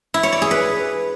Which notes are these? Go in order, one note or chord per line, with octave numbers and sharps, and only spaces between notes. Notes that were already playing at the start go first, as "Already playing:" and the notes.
E4
C#5
D5
G#4
B4